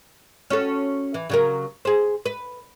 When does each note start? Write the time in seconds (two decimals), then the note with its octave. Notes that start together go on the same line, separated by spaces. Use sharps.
0.50 C#4 F#4 A4
1.14 E3
1.30 C#3 F#3 A#4
1.85 G#4 C5
2.26 B4